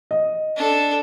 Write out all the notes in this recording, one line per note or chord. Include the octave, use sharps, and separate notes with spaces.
D#5
D4 A4